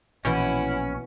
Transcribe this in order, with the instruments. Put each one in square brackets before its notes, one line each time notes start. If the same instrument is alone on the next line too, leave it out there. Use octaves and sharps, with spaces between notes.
[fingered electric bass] A#1 [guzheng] B2 E3 [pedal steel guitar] C#4 [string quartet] E4 F#5